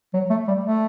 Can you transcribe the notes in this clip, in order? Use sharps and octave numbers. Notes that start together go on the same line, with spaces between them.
F#3
A3
G3
A3